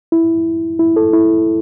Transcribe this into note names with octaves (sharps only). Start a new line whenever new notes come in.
E4
E4
A4
E4